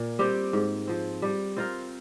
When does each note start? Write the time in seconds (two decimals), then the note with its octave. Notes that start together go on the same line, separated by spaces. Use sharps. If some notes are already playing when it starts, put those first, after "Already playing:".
Already playing: A#2 A#3
0.19 G3 C4 G4
0.53 G#2
0.87 F3 C4
1.22 G3
1.57 C4 F4 A#4